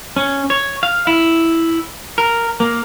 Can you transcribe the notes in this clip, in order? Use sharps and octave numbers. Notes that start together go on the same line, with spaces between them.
C#4
C#5
F5
E4
A#4
A#3